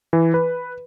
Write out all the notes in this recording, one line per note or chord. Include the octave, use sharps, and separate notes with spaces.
E3
B4